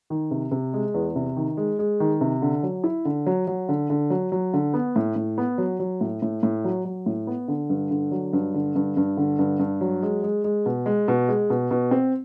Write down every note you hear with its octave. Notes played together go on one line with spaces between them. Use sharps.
D#3
C3
C3
G#3
E2
C3
D#3
G#3
G#3
D#3
C3
D3
F#3
E4
D3
F#3
F#3
D3
D3
F#3
F#3
D3
B3
A2
A2
B3
F#3
F#3
A2
A2
A2
F#3
F#3
A2
B3
D3
G2
D3
F#3
G2
D3
G2
G2
D3
G2
G2
F#3
G#3
G#3
G#3
B2
G#3
B2
G#3
B2
B2
C4